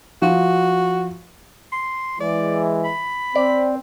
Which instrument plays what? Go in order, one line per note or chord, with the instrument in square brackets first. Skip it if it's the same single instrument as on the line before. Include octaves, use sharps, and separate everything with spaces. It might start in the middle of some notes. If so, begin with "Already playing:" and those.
[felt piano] F3 [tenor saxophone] F#4
[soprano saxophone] C6
[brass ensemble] E3 G#3 [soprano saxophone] D5
[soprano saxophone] B5
[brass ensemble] C4 [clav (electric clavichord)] D5